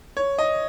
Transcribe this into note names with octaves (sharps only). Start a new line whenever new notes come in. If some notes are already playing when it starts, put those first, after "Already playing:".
C#5
D#5